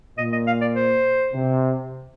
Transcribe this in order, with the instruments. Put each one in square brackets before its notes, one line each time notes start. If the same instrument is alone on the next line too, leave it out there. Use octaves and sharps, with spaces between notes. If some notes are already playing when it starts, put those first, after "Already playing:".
[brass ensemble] A#2 [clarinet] D#5
[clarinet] D#5
F5
D5
C5
[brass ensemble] C3